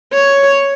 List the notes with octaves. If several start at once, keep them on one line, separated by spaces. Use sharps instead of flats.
C#5